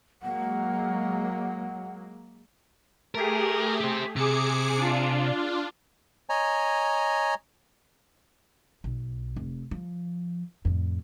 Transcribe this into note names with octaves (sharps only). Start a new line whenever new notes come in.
F#3 G#3 A#3 F#5
A3 G4 G#4 A#4
G4 C5
C3 G#4 D6 C#7
D4 F4
C#5 D#5 G#5 A#5
B1
F1
F3
F2 A2